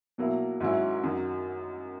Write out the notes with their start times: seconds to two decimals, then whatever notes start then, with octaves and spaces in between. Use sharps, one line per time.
0.18 B2 F#3 A#3 E4
0.60 G#2 D#3 F#3 C#4 E4
1.03 F#2 D#3 F#3